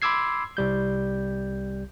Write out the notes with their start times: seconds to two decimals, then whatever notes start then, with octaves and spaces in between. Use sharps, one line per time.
0.02 B5 C6 D6 E6 G#6 C7
0.57 C2 G3 G6